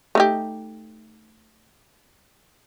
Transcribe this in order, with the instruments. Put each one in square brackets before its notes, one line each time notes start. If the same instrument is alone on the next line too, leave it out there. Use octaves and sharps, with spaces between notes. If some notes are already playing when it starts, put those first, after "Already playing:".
[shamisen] A3 D#4 G4